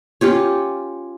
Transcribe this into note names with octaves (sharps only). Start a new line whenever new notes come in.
C#4 F4 G4 C#5